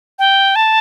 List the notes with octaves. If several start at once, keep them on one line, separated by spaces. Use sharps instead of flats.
G5
A5